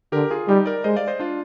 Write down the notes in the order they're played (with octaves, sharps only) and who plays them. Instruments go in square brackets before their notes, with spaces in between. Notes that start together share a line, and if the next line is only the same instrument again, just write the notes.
[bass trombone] D3 [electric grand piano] G4 A#4
[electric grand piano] F4 G#4
[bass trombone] G3 [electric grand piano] D#4 G4
[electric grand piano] A#4 D5
[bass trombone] G#3 [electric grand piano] C5 D#5
[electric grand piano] D5 F5
C5 D#5
D4 F4